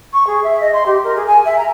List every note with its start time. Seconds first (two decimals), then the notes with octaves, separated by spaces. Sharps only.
0.13 C#6
0.27 G#4
0.44 E5
0.61 D#5
0.73 C6
0.86 G4
1.04 A#4
1.16 G#4
1.27 G#5
1.45 E5
1.58 A#5